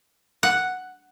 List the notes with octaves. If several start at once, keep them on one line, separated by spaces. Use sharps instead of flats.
F#5